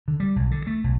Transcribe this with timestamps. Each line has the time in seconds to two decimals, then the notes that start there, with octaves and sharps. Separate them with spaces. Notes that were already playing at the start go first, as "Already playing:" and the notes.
0.08 D3
0.20 G3
0.36 B1
0.51 D3
0.67 A3
0.84 B1